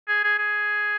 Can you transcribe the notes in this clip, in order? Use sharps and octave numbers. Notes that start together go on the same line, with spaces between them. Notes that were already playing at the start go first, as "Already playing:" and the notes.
G#4
G#4
G#4